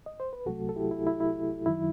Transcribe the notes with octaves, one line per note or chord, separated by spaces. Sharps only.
D#5
C5
B4
C2 C3 F#3 A3 F#4 A4
A4
E4 G4
E4
E4
E4
F#2 D#3 F#3 E4